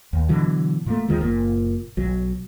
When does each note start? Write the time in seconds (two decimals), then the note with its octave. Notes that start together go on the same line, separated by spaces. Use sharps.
0.13 D#2
0.29 B2 D3 E3 F#3
0.86 A#2 A3
1.08 D2 D#3 F3 G#3
1.21 F#1 A#2
1.97 B1 F#3